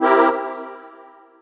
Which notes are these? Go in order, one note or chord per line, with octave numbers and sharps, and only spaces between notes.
C4 E4 G4 A#4